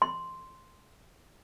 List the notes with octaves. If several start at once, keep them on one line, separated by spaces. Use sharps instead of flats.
C6